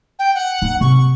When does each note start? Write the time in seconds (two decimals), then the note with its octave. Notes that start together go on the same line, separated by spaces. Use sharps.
0.19 G5
0.35 F#5
0.62 A#3 D#4
0.81 C3 C#6